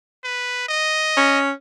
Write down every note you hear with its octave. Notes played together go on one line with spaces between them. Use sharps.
B4
D#5
C#4